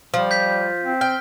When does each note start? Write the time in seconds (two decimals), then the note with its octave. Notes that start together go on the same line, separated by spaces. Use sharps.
0.14 F3 G3
0.31 G6 B6
0.84 C4
1.01 G5 F6